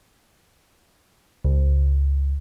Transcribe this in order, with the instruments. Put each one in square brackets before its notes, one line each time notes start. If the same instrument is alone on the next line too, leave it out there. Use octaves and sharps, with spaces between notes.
[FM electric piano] C#2